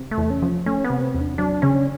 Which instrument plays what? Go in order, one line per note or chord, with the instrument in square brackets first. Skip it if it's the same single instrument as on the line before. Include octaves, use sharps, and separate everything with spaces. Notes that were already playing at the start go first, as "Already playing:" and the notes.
Already playing: [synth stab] C3
[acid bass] A3
[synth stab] E2
[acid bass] C#4
[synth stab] F3
[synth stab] A3 [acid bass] C#4
[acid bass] B3
[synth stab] C3
[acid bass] C4
[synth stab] E2
[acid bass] D4
[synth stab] F#3 [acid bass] D4
[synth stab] C#3 [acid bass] C#4